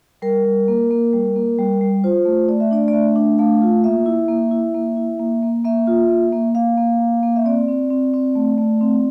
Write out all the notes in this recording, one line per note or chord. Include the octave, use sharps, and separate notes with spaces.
G3 A#4
G3
A#3
A#3
G3
A#3
G3
G3
F4 C5
A3
A3 D5
E5
D4 D5
D5
A3 E5
D4
A3 F5
F4
A#3 E5
E4
A#3
E4
A#3
E4
A#3
A#3
A#3 E5
F4
A#3
A#3
A#3 F5
A#3
A#3
A#3
E5
C4 D5
C4
C4
C4
A3
A3
C4